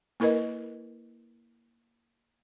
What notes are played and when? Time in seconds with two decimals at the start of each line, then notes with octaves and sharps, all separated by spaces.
0.20 A#3 E4 A#4 B4 D#5